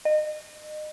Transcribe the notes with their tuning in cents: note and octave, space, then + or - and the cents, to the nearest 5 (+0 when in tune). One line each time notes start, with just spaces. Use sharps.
D#5 -30